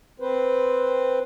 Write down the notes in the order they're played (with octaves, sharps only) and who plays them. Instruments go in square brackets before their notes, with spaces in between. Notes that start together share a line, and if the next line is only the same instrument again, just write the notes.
[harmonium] C4 B4 C5